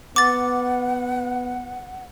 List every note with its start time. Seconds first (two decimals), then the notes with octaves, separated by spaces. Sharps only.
0.16 B3 F#5 D6 A6